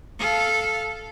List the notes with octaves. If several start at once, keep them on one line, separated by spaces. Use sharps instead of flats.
A4 F5